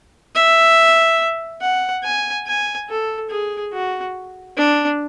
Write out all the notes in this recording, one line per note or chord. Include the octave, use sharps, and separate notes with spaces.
E5
F#5
G#5
G#5
A4
G#4
F#4
D4